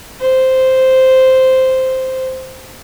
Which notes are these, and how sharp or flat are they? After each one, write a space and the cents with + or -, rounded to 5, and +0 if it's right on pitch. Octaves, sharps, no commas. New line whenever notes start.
C5 -5